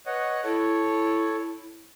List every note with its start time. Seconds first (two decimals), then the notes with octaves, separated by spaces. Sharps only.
0.06 B4 C#5 D#5 F#5
0.44 E4 A4 C#5